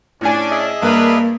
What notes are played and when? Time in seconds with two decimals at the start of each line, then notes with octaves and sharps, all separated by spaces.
0.21 A2 C#4 D4 G#5
0.51 G#4 D#5 E5
0.82 G2 A#3 D4 A#4 B4